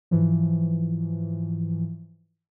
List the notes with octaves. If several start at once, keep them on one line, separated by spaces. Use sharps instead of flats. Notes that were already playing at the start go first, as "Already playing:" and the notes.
G#2 E3 F3